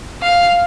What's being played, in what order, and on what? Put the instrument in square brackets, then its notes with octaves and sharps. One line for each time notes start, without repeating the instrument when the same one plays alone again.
[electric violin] F5